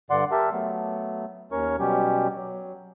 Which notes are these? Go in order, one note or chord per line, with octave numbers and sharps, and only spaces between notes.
G2 D3 D5 F#5 C6
G4 A#4 E5 A5
F#3 A3 B3
D#2 C#4 A#4 C#5 C#6
B2 F#3 G3 C#4 G4
F#3